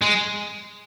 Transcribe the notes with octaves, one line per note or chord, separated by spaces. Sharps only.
G#3